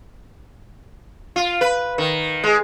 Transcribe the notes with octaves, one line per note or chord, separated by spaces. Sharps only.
F4
B4
D#3
G#3